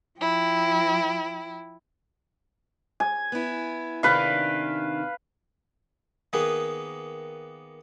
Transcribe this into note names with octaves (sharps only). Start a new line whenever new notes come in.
F3 E4 G5
G#5
B3 E4
C3 D#3 D4 B4 F5
D#3 A#3 B3 G#4 B4